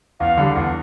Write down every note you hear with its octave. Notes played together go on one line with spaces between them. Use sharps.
E2 F5
D3 G3
E2